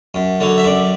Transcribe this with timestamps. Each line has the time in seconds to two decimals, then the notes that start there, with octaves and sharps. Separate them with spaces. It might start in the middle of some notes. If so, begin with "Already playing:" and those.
0.14 F#2
0.40 D3 F#3
0.58 E5
0.64 F#2 D5